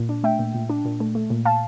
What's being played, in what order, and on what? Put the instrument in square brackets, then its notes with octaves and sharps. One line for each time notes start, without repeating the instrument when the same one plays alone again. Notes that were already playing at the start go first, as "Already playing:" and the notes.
Already playing: [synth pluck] A#2
D4
A3 E5 G5
A#2
A#2
D4
A#2
A3
A3
A#2
F5 A5